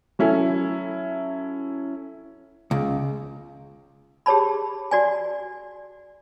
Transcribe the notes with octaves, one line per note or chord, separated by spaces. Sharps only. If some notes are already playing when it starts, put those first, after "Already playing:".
F#3 C#4 E4 A4
C#2
G4 G#4 C#5 A5 B5
F#4 D5 G#5